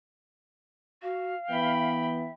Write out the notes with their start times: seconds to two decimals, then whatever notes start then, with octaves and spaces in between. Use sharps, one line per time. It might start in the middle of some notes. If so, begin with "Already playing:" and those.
1.03 F#4 F5
1.50 E3 B3 E5 G5 B5